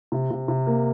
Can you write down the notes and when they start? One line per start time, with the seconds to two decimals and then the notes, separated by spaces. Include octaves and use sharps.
0.12 C3
0.31 C3
0.48 C3
0.67 A#3